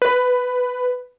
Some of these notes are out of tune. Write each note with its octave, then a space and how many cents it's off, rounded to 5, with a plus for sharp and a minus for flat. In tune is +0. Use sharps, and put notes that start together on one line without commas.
B4 +10